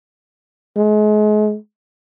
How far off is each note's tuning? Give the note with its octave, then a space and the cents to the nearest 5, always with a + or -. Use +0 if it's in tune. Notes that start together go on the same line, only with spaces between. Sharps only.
G#3 +35